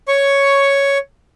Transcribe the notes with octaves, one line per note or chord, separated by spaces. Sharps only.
C#5 C#6